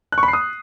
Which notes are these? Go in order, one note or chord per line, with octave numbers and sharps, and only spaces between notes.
F#6
C#6
B5
C7
D#6